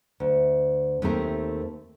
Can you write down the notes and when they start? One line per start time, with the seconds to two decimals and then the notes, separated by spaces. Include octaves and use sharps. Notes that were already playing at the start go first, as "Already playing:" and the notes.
0.20 D2
1.02 D#2 A3 C4 A#4